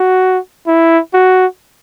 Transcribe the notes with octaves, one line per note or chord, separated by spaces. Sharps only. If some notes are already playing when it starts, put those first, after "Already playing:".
Already playing: F#4
E4
F#4